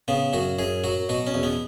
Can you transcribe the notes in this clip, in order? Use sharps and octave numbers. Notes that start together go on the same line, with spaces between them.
C#3 B3
F#2 F#4
F#2 G#4
F#3 F#4
B2 F#4
C#4
E2
B3